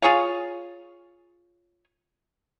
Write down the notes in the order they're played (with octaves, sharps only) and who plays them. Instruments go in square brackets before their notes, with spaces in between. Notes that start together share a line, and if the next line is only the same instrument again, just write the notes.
[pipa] F4 G#4 C#5 F5